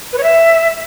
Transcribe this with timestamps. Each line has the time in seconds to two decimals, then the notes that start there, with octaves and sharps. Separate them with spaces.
0.12 B4
0.18 C#5
0.23 E5